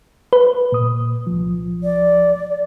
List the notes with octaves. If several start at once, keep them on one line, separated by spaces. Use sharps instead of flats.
B4
A#2 D#6
C2 F3
D5